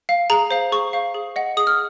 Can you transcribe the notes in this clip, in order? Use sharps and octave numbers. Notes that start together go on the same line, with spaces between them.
F5
G#4 A#5
C5 F5
G#4 C#6
C5 F5
G#4
D#5 F#5
G#4 D#6
F6